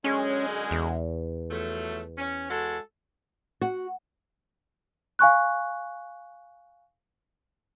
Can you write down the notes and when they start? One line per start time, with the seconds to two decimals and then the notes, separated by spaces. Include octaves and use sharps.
0.04 F#2 D3 G#3 C#4
0.71 E2
1.51 F3 F#3 A3
2.18 C#4
2.50 G#3 F#4 A4
3.61 F#4
5.19 F5 G#5 C#6 F#6